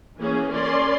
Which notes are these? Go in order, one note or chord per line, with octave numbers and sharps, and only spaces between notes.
E3 A#3 C#4 G#4
C#4 A#4 D5 C6